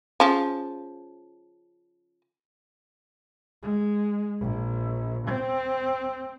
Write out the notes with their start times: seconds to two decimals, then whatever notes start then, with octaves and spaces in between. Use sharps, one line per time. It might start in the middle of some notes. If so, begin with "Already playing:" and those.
0.20 C#3 F3
3.63 G#3
4.40 A#1
5.27 C4